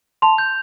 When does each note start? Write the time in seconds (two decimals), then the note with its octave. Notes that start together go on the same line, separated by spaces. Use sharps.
0.22 A5 C6 F7
0.38 G6